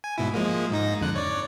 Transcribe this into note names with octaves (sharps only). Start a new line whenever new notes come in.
G#5
G#2 B2 E4
F3 G#3 A#3
G#2 D#4 A#6
F2 D3 F#6
C#5 D5